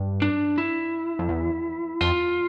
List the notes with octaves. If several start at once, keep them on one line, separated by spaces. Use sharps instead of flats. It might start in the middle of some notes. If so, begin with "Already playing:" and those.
Already playing: G2
D4
E4
F2
E2
F2 F4